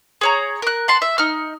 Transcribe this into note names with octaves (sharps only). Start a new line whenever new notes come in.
G#4 C#5 A#5
A#4 F#6
F#5 A5 C6
E5
D#4 F6